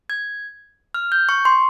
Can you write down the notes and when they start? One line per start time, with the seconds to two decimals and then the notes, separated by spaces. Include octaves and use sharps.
0.10 G#6
0.94 F6
1.12 G6
1.29 C#6
1.45 C6